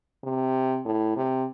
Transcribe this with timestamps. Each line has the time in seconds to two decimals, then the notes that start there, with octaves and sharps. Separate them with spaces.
0.24 C3
0.85 A2
1.16 C3